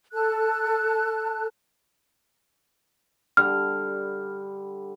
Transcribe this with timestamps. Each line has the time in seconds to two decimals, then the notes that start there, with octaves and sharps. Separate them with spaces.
0.12 A4 A5 F#6
3.37 D3 G3 F6